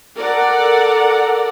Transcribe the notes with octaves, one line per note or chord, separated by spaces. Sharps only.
A4 A#4 D5 F#5